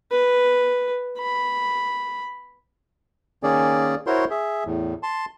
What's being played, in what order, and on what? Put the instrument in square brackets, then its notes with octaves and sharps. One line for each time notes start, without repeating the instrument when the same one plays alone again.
[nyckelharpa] B4
B5
[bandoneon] D#3 A#3 C#4 G#4 D5
E4 F#4 A#4 C5 C#5 C6
G#4 E5
E2 A2
A5 C6